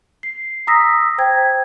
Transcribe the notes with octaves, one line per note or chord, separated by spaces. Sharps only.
C7
A#5 D#6 E6 A#6 B6
C5 G5 G#6